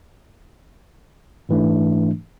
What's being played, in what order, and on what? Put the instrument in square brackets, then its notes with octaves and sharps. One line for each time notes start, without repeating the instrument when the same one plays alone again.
[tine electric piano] G#2 E3 A3 D4